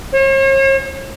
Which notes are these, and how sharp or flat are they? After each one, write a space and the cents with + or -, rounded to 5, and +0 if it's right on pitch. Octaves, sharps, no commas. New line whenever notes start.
C#5 -45